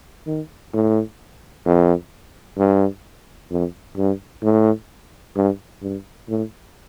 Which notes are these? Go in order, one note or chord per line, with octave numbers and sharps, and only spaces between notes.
D#3
A2
F2
G2
F2
G2
A2
G2
G2
A2